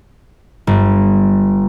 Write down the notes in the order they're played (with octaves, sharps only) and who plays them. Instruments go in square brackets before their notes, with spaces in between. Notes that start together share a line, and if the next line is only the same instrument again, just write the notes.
[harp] G1